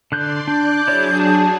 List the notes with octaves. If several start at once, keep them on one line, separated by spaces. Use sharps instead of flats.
D3 D5 C6 F#6 G6
D4 D5 D6 F#6 G6
F#3 D4 E4 G#4 C#5 D5
A5